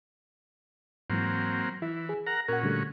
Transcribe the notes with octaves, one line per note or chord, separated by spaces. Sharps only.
G#2 E3 F#3 A#3 C4
E3 E4
G#4
A#4 F#5 A#5
A#2 C#4 F#4 A#4 F#5
D3 G3 A3